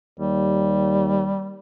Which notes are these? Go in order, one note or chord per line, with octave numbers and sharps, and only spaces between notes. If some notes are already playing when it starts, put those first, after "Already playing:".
D#2 G3